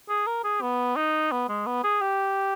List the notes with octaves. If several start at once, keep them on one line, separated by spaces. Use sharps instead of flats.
G#4
A#4
G#4
B3
D#4
B3
G#3
B3
G#4
G4